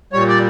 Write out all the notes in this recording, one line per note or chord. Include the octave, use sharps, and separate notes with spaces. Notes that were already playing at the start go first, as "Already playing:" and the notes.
A#2 G3 C#5
D5